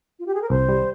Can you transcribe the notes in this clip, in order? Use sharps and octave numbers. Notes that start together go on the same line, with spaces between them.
F4
G4
G#4
A#4
C2 C5
G3